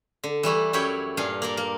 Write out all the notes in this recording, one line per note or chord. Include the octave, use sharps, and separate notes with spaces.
D3
E3 G3 A3 E4
F#2 G3 E4 C#5 G5 B5
G2 A#2 D4 F5 G#5
A#3 A#4 D5
A#3